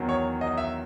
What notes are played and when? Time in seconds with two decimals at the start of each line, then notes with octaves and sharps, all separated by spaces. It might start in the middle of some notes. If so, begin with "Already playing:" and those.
Already playing: E2 D#3 F#3
0.09 C#5
0.41 D#5
0.57 E5